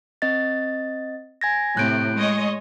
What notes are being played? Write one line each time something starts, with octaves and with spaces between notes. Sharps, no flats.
C4 D#5 A6
G#5 G#6 A#6
A2 C3 F#6 G6 D7
G#3 C#5 D#5